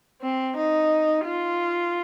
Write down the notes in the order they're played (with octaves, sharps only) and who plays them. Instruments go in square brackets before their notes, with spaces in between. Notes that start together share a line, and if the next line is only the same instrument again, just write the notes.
[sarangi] C4
D#4
F4